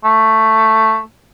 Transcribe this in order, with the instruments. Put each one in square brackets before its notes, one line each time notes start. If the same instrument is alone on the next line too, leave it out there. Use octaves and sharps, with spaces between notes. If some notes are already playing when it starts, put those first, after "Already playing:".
[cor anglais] A3